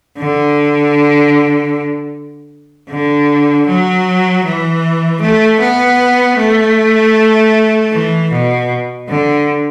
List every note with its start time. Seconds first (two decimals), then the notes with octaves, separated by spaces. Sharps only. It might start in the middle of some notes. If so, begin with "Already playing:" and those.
0.19 D3
2.90 D3
3.67 F#3
4.45 E3
5.22 A3
5.60 B3
6.38 A3
7.92 E3
8.31 B2
9.09 D3